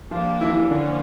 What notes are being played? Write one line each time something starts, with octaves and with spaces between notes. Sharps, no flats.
F3 A#3 D4 F4 G4
E3 E4
E3 E4
D3 F3 A#3 C#4 D4